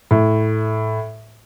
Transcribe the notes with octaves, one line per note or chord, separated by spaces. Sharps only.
A2